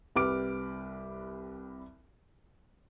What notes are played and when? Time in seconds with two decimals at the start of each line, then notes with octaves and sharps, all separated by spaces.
0.16 C2 G3 B4 D6 F6 D7